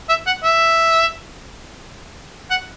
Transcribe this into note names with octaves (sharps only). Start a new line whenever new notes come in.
E5
F#5
E5
F#5